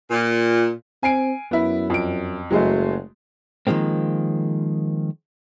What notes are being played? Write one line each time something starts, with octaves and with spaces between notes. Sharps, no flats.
A#2
C4 G#5 C7 D7
F#2 B3 E4
F2 D7
F#1 F#3 G#3 A3
D#3 F3 G#3 A#3 C4